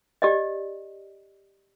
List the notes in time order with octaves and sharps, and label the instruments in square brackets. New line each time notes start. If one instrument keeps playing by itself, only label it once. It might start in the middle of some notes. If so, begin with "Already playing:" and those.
[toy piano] G4 D5 D#5